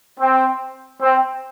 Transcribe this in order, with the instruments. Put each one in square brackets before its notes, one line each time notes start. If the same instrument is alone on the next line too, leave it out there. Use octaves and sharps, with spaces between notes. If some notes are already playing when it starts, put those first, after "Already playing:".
[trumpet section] C4
C4